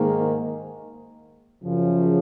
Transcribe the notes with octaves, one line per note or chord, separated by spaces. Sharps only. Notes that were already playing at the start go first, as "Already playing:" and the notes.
Already playing: G#2 D#3 A#3
F#2 C#3 F3